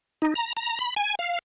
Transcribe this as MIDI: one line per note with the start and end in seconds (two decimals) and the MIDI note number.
0.22 0.34 63
0.35 0.53 82
0.57 0.79 82
0.79 0.94 83
0.96 1.15 80
1.19 1.39 77